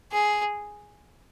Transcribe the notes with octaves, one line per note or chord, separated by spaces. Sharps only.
G#4